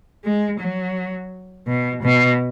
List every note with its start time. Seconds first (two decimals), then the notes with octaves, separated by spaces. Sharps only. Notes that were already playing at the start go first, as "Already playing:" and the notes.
0.24 G#3
0.60 F#3
1.67 B2
2.03 B2